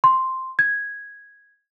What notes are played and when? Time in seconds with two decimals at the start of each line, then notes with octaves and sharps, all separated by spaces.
0.04 C6
0.59 G#6